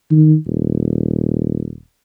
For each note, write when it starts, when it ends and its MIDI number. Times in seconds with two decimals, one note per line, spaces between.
0.11 0.35 51
0.46 1.76 27